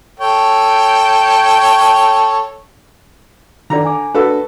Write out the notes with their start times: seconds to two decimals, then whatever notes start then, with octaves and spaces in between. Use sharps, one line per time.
0.20 A4 C#5 G5
3.70 D3 D#3 D5 A#5
3.85 G#5 D6
4.14 D4 F#4 A4 B4